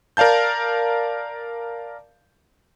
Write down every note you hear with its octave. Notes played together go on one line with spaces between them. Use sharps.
A#4 D5 F5 A5 G6